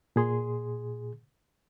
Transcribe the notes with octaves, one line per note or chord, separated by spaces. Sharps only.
A#2 G#4 C6